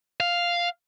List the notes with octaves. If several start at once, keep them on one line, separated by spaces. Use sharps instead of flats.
F5